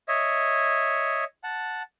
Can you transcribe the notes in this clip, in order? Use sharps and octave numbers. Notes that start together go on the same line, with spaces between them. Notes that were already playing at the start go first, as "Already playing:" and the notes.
C#5 D#5 E5
F#5 A5